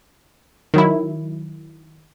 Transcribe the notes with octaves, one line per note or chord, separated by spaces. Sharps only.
D#3 F#3 E4